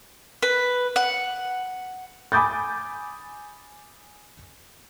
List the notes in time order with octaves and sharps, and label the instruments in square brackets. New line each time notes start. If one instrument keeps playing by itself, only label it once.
[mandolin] B4
F#5
[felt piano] G#5 B5 D6 D#6 G6 A6